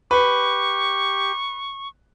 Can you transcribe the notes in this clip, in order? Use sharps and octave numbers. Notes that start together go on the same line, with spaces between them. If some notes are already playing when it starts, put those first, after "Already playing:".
G4 B4 C#6